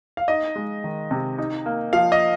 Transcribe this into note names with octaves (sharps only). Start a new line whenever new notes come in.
F5
D#4 D#5
G#3
D#3
C3
D#4
A#3
F3 F5
D#5